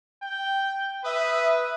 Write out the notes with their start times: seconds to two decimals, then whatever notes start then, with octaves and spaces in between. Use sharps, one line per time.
0.22 G5
1.04 B4 E5 D#6